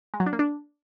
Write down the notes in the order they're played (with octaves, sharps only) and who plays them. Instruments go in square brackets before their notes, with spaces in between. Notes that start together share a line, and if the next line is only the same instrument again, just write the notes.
[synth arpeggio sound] G#3
F#3
D4
A#3
D4